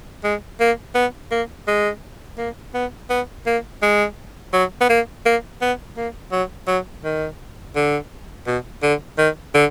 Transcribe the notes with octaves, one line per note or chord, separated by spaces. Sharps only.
G#3
A#3
B3
A#3
G#3
A#3
B3
B3
A#3
G#3
F#3
B3
A#3
A#3
B3
A#3
F#3
F#3
D#3
D3
B2
D3
D#3
D3